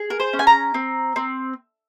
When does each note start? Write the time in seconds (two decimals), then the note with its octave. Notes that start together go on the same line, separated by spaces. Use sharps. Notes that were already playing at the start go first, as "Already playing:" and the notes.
Already playing: G#4
0.10 A#4
0.20 C5
0.33 C#4
0.39 G#5
0.47 A#5
0.74 C4
1.16 C4